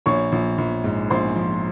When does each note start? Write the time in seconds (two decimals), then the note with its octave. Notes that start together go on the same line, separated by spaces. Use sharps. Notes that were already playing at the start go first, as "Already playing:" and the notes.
0.06 A#1 C#5 C#6
0.32 A#1
0.58 A#1
0.84 G#2
1.10 A#1 C5 C6
1.36 F3